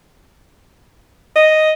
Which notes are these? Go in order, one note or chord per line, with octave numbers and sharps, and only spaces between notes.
D#5